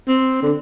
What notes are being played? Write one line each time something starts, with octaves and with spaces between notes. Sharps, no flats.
C4
D3